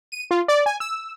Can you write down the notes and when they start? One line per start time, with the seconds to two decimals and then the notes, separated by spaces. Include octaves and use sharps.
0.12 D#7
0.31 F4
0.48 D5
0.66 G#5
0.80 E6